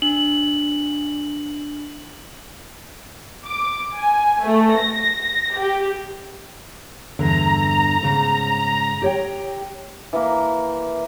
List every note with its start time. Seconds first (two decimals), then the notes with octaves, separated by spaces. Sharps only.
0.02 D4 F#7
3.45 D6
3.97 G#5
4.44 A3
4.78 A#6
5.57 G4
7.19 E2 G2 D3 A#5
8.03 G#2 C#3
9.02 G4 C#5 G5
10.13 E3 A#3